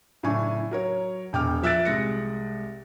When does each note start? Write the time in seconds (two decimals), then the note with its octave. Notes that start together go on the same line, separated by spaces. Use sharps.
0.23 F#2 A2 C#3 D4 G#5 C#6
0.71 F#3 A#4 C#5
1.33 E1 G5 D6 F6
1.63 F3 E5 E6 F#6 A6 D7
1.85 C2 G#3 A#6 C#7